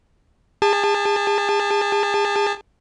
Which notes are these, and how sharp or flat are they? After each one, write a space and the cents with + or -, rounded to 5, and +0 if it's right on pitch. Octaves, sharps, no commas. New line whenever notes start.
G#4 -35 A5 +0